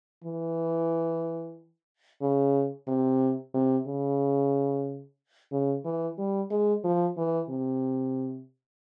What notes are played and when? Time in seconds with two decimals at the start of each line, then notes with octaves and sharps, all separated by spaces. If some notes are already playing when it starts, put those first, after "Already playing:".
0.24 E3
2.22 C#3
2.88 C3
3.54 C3
3.87 C#3
5.52 C#3
5.85 E3
6.18 G3
6.51 G#3
6.84 F3
7.17 E3
7.50 C3